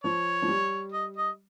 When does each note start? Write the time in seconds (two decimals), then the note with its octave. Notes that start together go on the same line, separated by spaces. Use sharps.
0.04 F3 C#5
0.42 F3
0.48 G3
0.92 D#5
1.17 D#5